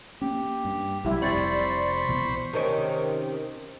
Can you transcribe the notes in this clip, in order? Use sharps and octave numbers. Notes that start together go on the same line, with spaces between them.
A#3 C#4 G4
G2
B1 C3 F#3 G3 E4 G4
F1 C3 C5 D5 B5 C#6
C2 B2 E3
C3 D#3 C#4